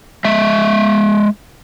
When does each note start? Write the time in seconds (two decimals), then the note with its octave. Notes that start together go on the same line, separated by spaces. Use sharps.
0.25 G#3 E5